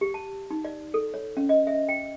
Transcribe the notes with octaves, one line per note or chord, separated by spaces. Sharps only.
G4
A5
D#4
D5
A4
C#5
C#4
D#5
E5
G5